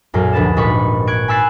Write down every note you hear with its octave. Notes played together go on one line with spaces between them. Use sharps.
B1 F#2 A#2
F1 D2 B4 A6 E7
G#1 A#2 D#4 B4 B5 C#6
C#6 F#6 G#6 D7
G#5 B5 E6 F#6 A6 C7